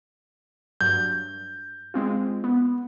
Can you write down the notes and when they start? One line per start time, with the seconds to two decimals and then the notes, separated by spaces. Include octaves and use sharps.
0.81 G2 F#3 G6
1.94 G#3 C4 F4
2.44 B3